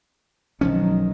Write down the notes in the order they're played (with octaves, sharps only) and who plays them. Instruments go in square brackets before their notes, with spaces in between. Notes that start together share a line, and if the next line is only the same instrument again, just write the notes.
[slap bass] B1 F3 C#4 [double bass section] D#3 F#3